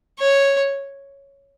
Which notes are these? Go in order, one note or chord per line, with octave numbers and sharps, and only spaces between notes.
C#5